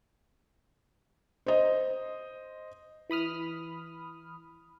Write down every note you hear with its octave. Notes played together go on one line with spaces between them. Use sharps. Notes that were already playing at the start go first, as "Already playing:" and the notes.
C5 D#5
E3 B5 D#6 F6